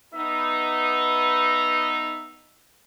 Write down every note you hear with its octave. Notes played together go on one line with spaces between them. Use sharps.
B3 D#4 E5